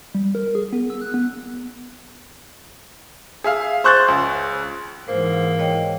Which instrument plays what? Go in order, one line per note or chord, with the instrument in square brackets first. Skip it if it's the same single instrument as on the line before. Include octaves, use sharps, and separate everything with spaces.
[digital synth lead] G3
A#4
G#4
B3
E6
F#6
B3
[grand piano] G#4 E5 F5
C5 C#6 F#6 G6 A6
C#2
[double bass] G#2 E3 [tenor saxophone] A#3 [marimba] C5
[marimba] C#5 D#5 G5